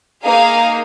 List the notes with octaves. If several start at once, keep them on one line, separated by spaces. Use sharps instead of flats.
A#3 D#4 G#4 F5